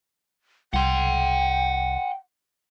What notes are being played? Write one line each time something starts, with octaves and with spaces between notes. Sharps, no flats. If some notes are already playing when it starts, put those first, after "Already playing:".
C2 F#5 G5 C6